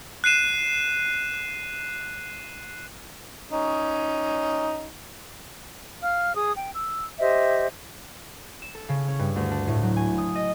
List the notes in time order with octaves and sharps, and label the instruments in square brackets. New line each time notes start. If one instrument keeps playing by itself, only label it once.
[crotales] F#6 C7 D#7 E7
[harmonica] C#4 D#4
[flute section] F5 F6
G#4 D#6
G5
E6
G4 C5 D#5 E5
[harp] E7
A4
C#3
C#4
G2
D2
D4
A2
F#3
G#5
D#6
D#5